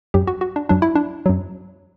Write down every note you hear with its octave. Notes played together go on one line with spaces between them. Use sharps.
F#2 F#3 G4
F#4
F#4
D4
F#2 F#3 D4
E4
D4
F#2 F#3